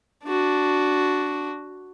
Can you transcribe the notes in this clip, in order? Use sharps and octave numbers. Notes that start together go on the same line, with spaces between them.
D4 F#4